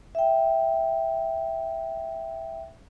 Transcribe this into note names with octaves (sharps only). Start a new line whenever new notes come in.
E5 G5